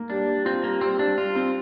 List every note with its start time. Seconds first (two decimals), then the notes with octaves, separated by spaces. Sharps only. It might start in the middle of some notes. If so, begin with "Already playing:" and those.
Already playing: A#3
0.10 G3 D4
0.27 G3
0.45 C4 F4
0.64 G3 A#3
0.81 G3 C4
0.99 G3 D4
1.17 G3 F4
1.35 C4